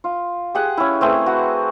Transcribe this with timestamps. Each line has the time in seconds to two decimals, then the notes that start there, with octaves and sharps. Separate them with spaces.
0.04 F4
0.55 G4 G#4 F#5
0.77 C#4 E4
1.01 A3 C4 G#4 B4
1.26 F#4 F#5